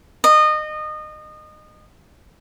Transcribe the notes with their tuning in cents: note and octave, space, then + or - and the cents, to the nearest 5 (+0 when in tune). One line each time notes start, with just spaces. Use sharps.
D#5 -25